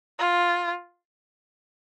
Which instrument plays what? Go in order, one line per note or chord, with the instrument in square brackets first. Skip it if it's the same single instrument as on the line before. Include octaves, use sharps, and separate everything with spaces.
[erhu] F4